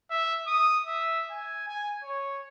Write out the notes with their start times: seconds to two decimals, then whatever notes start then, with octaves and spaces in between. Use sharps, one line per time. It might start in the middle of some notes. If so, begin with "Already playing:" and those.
0.10 E5
0.47 D#6
0.86 E5
1.31 G#5
1.68 G#5
2.03 C#5